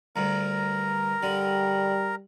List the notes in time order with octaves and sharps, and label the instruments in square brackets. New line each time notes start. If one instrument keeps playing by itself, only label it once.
[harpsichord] D2 G2 [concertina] A#4 A#5
[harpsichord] D3 [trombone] G3